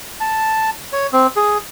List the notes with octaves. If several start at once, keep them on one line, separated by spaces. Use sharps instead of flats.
A5
C#5
C4
G#4